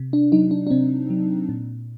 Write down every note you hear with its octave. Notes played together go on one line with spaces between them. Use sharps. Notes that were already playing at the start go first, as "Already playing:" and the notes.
Already playing: C3
D4
F#3 D#4
D4
D4
C3 C4
F#3
A#2